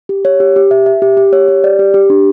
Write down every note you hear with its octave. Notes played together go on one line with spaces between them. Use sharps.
G4
C#5
G4
G4
E5
E5
G4
G4
C#5
G4
D5
G4
G4
D4